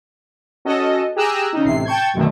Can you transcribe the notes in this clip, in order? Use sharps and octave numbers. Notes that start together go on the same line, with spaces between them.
C#4 F#4 A4 D#5
G4 G#4 G#5 A#5 E6 F#6
C#3 D#4
A1 C3 C7
G5 A5 C#6 G6 G#6
F#2 B2 D3 D#3 A3